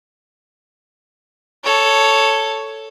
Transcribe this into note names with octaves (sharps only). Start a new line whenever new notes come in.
A4 C#5